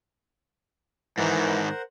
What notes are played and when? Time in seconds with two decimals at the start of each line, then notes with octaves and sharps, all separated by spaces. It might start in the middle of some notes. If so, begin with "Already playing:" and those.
1.18 G#2 D#3 E3 A#4 C5 F#5